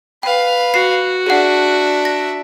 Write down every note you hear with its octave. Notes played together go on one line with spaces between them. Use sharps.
B4 F5 G5
F#4 C7
D4 G#4 E5 F#5
A#6